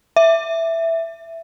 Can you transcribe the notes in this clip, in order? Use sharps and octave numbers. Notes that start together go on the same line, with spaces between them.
E5